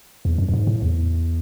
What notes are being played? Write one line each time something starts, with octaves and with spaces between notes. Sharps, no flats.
E2
F#2
F#2
G#2
A2
E2